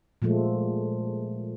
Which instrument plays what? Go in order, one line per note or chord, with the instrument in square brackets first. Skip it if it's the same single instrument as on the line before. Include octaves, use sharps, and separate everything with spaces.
[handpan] A#2 F3 G#3 A3